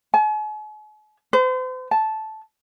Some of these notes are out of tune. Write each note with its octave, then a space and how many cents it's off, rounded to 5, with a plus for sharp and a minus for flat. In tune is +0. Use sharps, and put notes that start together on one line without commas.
G#5 +45
C5 -40
A5 -10